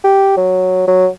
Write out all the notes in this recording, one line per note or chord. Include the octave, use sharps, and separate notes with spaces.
G4
F#3
F#3